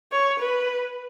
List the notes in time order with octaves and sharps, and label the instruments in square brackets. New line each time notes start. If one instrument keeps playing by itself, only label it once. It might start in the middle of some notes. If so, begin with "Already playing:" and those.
[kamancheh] C#5
B4